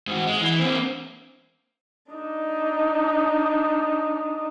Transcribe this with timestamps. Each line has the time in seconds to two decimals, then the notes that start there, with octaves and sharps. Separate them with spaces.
0.07 G#2 F#4
0.27 G#3
0.41 E3
0.59 A#3 C4
2.11 D4 D#4